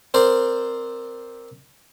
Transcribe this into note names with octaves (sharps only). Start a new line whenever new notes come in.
C4 A#4 C5 D5